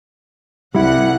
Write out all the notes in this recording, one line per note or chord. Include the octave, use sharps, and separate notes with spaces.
C2 G3 E4 F#5